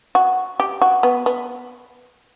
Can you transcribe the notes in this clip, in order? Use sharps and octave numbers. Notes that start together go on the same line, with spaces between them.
F#4
G4
F#4
B3
B3